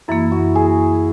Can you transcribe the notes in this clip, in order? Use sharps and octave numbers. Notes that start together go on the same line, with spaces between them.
F#2 E3 A#3 E4
F#4
G#4